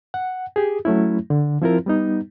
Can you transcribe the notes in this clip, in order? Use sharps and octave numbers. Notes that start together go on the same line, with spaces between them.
F#5
G4 G#4
F#3 A3 C#4 E4
D3
F3 C4 E4 F4 A#4
G3 B3 D#4